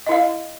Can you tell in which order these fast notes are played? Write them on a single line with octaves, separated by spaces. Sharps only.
D#5 E4 F5